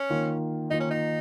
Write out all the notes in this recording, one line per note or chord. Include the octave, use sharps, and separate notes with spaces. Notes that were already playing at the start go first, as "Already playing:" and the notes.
Already playing: C#4
D#3 A#3 F4
D#3 A#3 D#4 F4
C#4
D#4